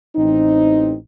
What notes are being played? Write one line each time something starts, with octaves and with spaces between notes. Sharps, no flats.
A1 C4 D#4